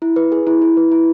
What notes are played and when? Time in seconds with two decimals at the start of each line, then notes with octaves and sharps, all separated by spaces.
0.02 E4
0.16 B4
0.32 G#4
0.47 E4
0.62 E4
0.77 B4
0.92 E4